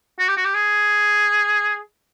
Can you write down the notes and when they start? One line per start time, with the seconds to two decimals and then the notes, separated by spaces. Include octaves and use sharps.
0.19 F#4
0.28 G4
0.37 F#4
0.45 G4
0.54 G#4